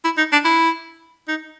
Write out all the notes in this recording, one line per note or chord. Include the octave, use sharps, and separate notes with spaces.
E4
D#4
D4
E4
D#4